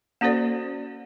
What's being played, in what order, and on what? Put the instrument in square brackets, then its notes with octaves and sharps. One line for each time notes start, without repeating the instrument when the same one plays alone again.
[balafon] A#3 C#4 F#4 A4 C5 D5